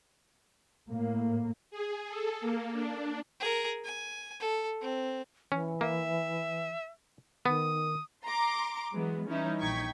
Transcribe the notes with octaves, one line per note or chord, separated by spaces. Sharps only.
A2 A#3
G#4
A4
A#3
D4
G#4 A#4
G#5
A4
C4
E3 C#4
A#3 E5
D#3 B3 D#6
A#5 C6 D6
E3 F#3 G#3 B3
E3 G3 C#4 D#4 E4
A#1 D#4 G5 C#6 G#6 B6